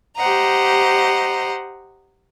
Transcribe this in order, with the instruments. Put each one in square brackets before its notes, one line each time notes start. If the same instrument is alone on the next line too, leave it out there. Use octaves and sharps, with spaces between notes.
[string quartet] G4 C5 D#5 F#5 A#5